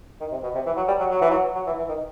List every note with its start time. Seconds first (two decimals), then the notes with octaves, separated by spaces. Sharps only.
0.20 D#3
0.32 C3
0.43 B2
0.55 C3
0.66 E3
0.76 F#3
0.88 G3
1.00 F#3
1.11 F#3
1.21 E3
1.30 F#3
1.55 F#3
1.67 E3
1.78 E3
1.89 D#3